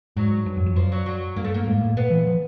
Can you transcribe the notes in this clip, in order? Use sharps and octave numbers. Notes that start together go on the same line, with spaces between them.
G#2 F#3
G2
F#2
F2
F#2 F3
F#3
F#3
G2 A#3
A3
A#3
G#2
A2
A#2 B3
E3
F3